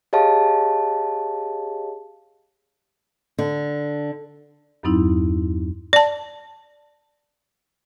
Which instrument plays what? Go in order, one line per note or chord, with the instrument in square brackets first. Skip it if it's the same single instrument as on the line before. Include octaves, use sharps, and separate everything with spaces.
[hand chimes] G4 G#4 C#5 D#5 F5 A5
[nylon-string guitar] D3
[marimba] E2 G2 F#3 C4 D#4 E4
[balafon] D5 A5